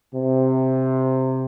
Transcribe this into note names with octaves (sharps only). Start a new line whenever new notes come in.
C3